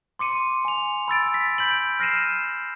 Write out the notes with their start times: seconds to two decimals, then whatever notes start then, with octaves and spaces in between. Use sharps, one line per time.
0.19 C6 D6 C#7 D#7
0.65 G#5 F7
1.08 B5 E6 A6 D7
1.34 B6
1.58 B5 G6 D7 F#7
2.00 F6 A#6 C7 D#7 E7